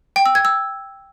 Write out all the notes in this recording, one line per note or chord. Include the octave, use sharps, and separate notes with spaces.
G5
E6
G#6
E6